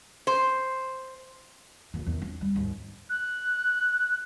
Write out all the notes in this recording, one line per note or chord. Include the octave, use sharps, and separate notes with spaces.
C5
D#2 F4
E2 D#3
C#4
G3
G#1 D#2
F#6